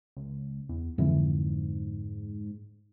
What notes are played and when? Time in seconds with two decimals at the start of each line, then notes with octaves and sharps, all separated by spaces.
0.17 C#2
0.69 E2
0.98 F2 G#2 D3 E3